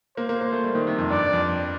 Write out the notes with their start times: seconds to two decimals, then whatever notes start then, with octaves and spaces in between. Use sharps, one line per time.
0.17 A#3 C5
0.29 A#3
0.41 A#3
0.52 A3
0.64 G3
0.75 D#3
0.87 C3
0.98 F2
1.10 G2 D5
1.33 F2